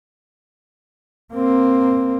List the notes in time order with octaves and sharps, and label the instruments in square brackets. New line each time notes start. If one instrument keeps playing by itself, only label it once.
[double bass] A#3 C4